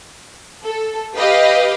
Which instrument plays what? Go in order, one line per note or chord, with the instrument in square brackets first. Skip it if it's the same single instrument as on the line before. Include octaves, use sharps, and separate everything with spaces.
[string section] A4
G4 B4 D#5 F5